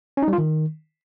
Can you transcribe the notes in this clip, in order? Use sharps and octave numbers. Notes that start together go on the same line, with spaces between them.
C#4
D#4
G3
F4
D#3